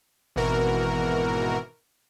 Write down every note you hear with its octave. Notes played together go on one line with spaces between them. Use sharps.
G#1 B2 E3 F#4 A#4